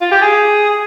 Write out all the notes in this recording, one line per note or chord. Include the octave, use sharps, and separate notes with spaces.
F4
G4
G#4